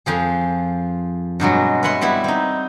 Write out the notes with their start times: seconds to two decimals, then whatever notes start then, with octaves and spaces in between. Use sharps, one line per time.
0.06 F2 F3 G#4
1.40 G2 B2 F#3 G#3
1.83 B4 C#5 E5 F#5 C6
2.01 G3 B3 E4
2.24 C4 D#4